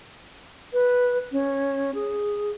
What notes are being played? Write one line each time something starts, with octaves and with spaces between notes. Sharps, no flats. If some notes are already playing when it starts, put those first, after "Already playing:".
B4
C#4
G#4